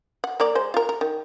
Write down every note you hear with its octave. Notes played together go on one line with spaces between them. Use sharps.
F#5
A#3 A#4 D5
G#3 C5
F4 A#4
A#4
D#3